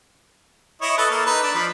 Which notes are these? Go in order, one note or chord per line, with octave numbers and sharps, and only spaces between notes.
E4 C#5 D#5
A4 B4 D#5
A#3 A4
D#4 B4
D4
F3 B5